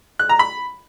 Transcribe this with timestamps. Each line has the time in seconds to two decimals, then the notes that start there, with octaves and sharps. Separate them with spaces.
0.19 F#6
0.29 A#5
0.39 B5